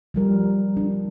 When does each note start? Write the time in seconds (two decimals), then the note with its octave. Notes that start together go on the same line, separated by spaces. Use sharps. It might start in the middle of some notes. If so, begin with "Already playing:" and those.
0.14 F3 G3 A#4
0.77 D4